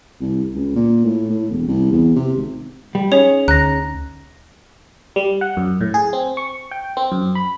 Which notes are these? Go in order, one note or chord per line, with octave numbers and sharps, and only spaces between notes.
C2
C#2
A#2
A2
A2
E1
C2
E2
C3
G#1
G3
C#4 D#4 G#4 C#5 F7
D2 A#5 F#6 A#6
G3
F#5
F#2
A2
G#4
C4
C#6
G5
C4
F#2
B5